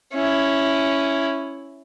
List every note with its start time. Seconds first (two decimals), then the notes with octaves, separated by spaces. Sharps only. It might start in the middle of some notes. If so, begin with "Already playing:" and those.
0.14 C#4 E4